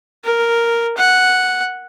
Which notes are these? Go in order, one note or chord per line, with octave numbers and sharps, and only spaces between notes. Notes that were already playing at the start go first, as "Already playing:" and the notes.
A#4
F#5